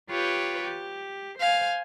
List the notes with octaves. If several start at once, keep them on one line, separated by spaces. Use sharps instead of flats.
F4 G4 B4 C#5 G5
G4
C5 F5 G#5